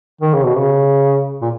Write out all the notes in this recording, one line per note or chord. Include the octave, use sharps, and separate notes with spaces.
D#3
C#3
B2
C#3
A#2